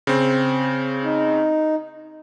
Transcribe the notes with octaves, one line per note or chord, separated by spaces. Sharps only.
C#3 C4
D#4